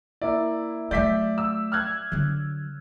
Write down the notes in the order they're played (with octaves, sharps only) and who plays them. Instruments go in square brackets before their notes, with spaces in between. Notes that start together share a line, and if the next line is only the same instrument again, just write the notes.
[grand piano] A#3 D5 [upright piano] E4
[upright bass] F#3 A3 [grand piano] D5 E5 [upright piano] G6 B6
[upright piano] E6
F6 F#6 G#6
[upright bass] D3 F#3